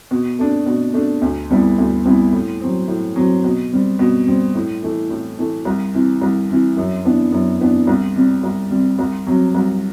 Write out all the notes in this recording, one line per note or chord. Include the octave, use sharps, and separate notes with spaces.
B2
A3 D4
B2
A3 D4
D2
C3 G3 B3 E4
D2
C3 G3 B3 E4
A2
F#3 C4
A2
F#3 C4
B2
G3 C4
B2
G3 C4
A2
E3 A3
A2
E3 A3
C2
C3 E3
C2
C3 E3
F#2
E3 B3 D4
F#2
E3 B3 D4
C2
C3 G3
C2
C3 G3
C2
C3 F#3
C2